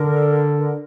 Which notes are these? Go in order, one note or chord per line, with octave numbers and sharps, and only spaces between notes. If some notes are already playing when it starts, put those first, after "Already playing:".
Already playing: D3 A#4
A#4